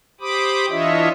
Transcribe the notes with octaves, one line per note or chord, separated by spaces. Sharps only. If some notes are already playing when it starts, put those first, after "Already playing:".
G4 C5 B5 D6 D#6
E3 D4 F4 C#5 D#5 E5